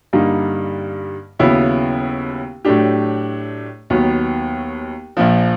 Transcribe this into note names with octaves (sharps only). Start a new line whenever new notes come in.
G2 D3 G3 A#3 D#4
D#2 C#3 F#3 B3 E4
A2 F#3 A3 D4 G4
D#2 D#3 F#3 B3
A#1 A#2 F3